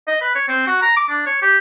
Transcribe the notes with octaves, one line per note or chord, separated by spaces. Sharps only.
D#5
B4
C#5
C4
F#4
A#5
D6
D4
C#5
G4